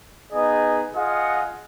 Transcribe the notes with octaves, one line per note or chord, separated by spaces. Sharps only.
B3 D#4 G#4 D#5
F4 G#4 D#5 F#5